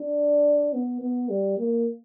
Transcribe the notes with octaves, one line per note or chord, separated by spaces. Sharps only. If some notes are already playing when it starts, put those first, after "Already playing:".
Already playing: D4
B3
B3
G3
A#3